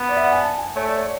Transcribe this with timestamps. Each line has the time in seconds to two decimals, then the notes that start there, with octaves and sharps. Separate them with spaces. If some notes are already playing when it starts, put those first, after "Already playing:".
Already playing: B3 B5
0.09 D5
0.17 E5
0.24 F#5
0.32 G#5
0.40 A5
0.58 G#5
0.76 A3 C#5
0.87 D5
0.97 C#5